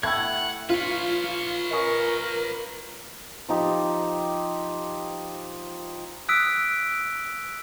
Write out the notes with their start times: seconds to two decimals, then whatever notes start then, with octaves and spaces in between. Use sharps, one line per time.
0.03 A3 E4 F#5 G5 G#6
0.70 F4 B4 C#5
1.71 C#4 A#4 D#5
3.49 F3 D#4 G4
6.29 D#6 E6 F#6 B6 D7